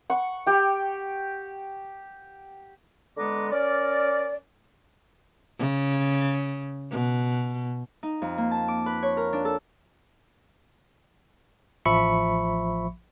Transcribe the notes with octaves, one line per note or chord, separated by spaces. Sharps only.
F#5 C#6
G4 G5
D3 G#3 B3 A#5 D6
C#4 A#4 D5
C#3
B2
D#4
F2
A#3
A5
D6
B4
C#5
A#4
D4
A4
A1 F3 E5 B5 C#6 C#7